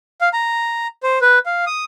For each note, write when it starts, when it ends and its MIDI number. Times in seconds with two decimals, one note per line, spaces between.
0.21 0.29 77
0.33 0.87 82
1.03 1.19 72
1.21 1.39 71
1.46 1.65 77
1.67 1.84 87